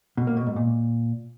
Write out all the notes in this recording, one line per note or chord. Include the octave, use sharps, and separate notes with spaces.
B2
A#3
B2
G#2
A#2